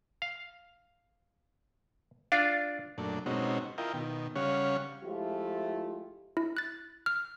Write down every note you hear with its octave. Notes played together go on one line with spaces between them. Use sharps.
F5
D4 F4 D5 F5
F#2 A#2 A3 D4
B2 G#3 C4 C#4 D#4 F#4
E4 F4 A#4 D#5 G5
B2 D#3
C#3 G3 C#4 C#5 F5 F#5
F3 G#3 A3 E4 F4 G4
E4
F#6 A6
F6